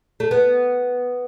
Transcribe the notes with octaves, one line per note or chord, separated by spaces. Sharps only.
A3
B3